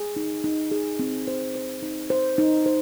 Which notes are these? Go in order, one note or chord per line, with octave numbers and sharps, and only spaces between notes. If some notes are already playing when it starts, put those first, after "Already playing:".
Already playing: G#4
D#4
D#4
G#4
C4
C5
C5
D#4
C5
D#4
C5